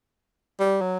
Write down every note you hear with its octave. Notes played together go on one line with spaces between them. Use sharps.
G3
F#3